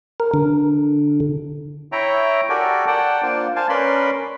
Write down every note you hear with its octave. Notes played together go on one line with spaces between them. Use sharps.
A#4
D3
E4 C#5 E5 G5 A#5
F#4 G4 A4 A#4 D5 G#5
D5 F#5 G5 A5
A#3 D4 F4 C5
C5 F5 G#5 A5
C#4 A#4 B4 D5 B5 C6